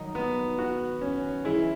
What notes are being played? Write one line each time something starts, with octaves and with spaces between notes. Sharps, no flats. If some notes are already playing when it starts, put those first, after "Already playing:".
Already playing: D#3 F#3 D#4
B3
F#4
C#4
E3 G#3 E4